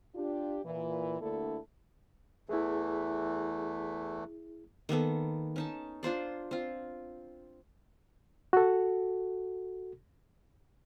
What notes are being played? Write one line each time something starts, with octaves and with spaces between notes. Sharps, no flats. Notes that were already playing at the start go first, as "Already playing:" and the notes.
D4 F4 G4
A#2 E3
D2 D3 A3 A#3 E4 A4
E2 E3 A3 E4 G#4
D#3 A#3 B3 A4
C#4 D#4 A5
D4 F4 C5 D5
C4 F4
F#4 A4